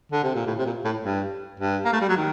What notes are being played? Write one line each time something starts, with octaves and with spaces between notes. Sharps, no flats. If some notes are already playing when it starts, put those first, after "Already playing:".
D3
C3
A#2
A2
C3
A#2
A2
G2
G2
A#3
A3
G3
F#3
D#3